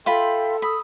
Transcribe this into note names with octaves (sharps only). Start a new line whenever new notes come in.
F4 A4 E5 G5 B5 C6
B5 D#6 E6